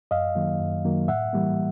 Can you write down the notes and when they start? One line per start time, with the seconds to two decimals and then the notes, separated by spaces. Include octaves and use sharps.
0.11 F#2 D#5 F5
0.35 D#3 F#3 A#3
0.60 F#2
0.85 D#3 F#3 A#3
1.08 A2 E5 F#5
1.33 E3 G3 A#3